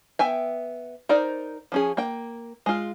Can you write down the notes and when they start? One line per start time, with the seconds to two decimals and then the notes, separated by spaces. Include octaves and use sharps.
0.19 B3 E5 G5 G#5
1.09 D#4 A#4 C5 D5
1.72 F3 C#4 G#4
1.97 A#3 G5
2.66 G#3 F4